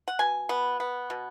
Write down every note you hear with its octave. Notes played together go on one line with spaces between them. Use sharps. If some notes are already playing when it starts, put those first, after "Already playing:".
F#5
B2 G#5
B3
B3
B2